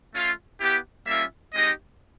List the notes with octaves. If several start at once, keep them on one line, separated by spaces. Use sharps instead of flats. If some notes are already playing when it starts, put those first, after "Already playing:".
A3 C#4 F4
B3 E4 G4
G3 A#3 C#4 F4 E5
G#3 C4 D#4 G4 D#5